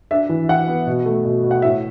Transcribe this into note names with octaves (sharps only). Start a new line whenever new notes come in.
D4 E5
E3
E3 F#5
B3
B2
A3
B2
B2
F#5
A2 E5